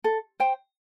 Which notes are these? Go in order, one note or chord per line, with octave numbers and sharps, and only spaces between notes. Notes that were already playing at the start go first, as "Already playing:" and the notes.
A4
C5 G5